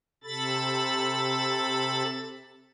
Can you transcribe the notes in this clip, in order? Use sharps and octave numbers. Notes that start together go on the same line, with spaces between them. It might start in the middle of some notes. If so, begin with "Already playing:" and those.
C3 A4 B5 A6